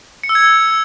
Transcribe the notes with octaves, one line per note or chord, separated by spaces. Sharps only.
C#7
E6
G#6